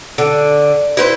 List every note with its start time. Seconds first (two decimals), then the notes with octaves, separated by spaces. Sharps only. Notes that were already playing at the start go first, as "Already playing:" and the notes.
0.18 D3
0.97 E4 B4 C5